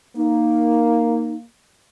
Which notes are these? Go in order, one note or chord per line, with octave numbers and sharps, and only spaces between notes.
A#3 D#4